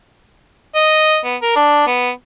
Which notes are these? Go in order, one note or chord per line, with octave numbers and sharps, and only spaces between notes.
D#5
B3
A#4
D4
B3